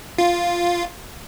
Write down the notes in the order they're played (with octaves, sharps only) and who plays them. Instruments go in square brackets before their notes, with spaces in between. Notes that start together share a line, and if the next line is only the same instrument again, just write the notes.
[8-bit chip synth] F4